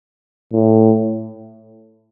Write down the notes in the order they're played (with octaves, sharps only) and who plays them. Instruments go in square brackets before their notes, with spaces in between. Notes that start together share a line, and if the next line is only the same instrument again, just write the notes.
[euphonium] A2